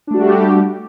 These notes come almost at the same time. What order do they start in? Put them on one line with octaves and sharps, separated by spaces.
D4 A3 F#4 G3 G4